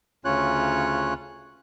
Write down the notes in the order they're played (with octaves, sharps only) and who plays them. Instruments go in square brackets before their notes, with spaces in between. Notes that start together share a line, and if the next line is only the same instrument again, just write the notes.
[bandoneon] D2 C#3 C#4 F4 C#5 F#6